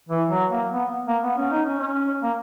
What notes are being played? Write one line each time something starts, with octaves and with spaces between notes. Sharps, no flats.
E3
F#3
A#3
B3
A#3
B3
C#4
D#4
C#4
C#4
A#3